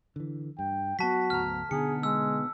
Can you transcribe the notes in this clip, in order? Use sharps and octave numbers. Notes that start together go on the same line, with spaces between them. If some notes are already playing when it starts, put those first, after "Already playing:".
D3 E3
G2 G5
F#3 B3 F#4 A5 B6
D2 G#2 A#5 F6
B2 D3 B3 D#4 G#4 C#7
G#3 E6